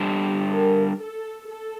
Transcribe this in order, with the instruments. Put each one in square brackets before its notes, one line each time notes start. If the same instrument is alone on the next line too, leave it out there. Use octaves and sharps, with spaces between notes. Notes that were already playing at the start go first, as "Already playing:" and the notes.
Already playing: [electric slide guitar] G3 D4 A4 C5
[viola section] G4
A#4
A4
A4